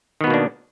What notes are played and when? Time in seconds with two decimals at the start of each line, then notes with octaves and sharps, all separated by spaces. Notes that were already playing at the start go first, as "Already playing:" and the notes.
0.21 D#3
0.24 B3
0.27 B2
0.30 A#3
0.34 D4